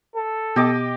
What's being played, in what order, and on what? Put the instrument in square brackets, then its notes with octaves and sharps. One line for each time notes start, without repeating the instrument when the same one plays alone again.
[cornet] A4
[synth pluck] B2 [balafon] B3 [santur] G4 D#5 D6